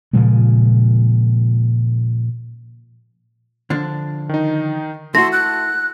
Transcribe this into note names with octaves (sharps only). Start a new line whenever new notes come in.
A#2 C#3 F3 G#3
D3 F3 D4
D#3 D#4
A3 E4 F#4 A5 C6 E6 A#6
F#6